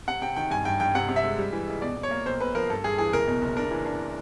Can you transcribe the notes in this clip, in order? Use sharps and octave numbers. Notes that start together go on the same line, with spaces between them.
C3 F#5
C3 G5
D#3 G5
G2 G#5
G2 G5
G2 G5
C3 F#5
C3
E5
G#3
G3
E3
C#2
B2 D5
B2
C#5
A#3
B1 C5
B1 B4
F3 A#4
G2 A4
G2 G#4
E3 G#4
F#1 A#4
B2
F#1
D4 A#4
E3
D4